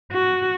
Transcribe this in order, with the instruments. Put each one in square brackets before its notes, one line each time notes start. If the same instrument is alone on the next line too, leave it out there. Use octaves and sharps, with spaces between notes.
[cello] F#4